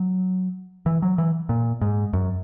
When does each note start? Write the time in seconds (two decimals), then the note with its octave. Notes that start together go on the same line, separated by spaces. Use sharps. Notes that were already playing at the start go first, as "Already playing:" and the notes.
Already playing: F#3
0.86 E3
1.02 F#3
1.18 E3
1.49 A#2
1.81 G#2
2.13 F#2